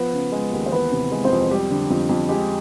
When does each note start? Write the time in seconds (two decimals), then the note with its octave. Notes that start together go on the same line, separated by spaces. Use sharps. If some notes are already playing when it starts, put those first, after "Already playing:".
Already playing: F3 B3 B4
0.13 C#3
0.32 G#3
0.53 D#2
0.66 C5
0.72 E3 B3 B4
0.91 C3
1.12 G#3
1.25 C4 C5
1.31 F2
1.51 G3 G4
1.70 D3
1.90 F2
2.09 F2
2.29 G#3 G4